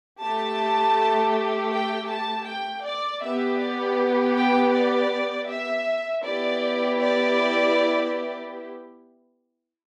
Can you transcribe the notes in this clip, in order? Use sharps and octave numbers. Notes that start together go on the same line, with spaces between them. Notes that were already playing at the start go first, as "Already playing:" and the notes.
A3 G4 A5
G5
A5
G5
D5
B3 G4 E5
D5
G5
D5
E5
B3 E4 G4 D5
D5